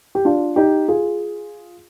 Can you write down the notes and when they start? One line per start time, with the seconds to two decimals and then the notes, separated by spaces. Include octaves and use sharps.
0.15 G4
0.25 D4 F4
0.56 D#4 G4
0.88 F4 G#4